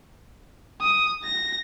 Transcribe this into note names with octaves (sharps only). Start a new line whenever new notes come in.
D#6
A#6